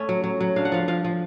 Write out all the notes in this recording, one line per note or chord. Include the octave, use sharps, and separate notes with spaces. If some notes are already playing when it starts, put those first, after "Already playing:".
Already playing: A3 C#4
F#3
F#3
F#3
D4 F5
F#5
F3 F5
F3 F5
F3